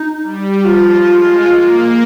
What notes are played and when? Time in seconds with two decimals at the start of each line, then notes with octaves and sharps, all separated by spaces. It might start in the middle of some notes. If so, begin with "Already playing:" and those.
Already playing: D#4
0.22 G3
0.58 G4
0.65 F3 F4
1.07 G#3
1.49 A#3